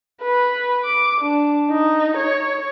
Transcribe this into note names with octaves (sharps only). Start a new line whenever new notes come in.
B4
D6
D4
D#4
C#5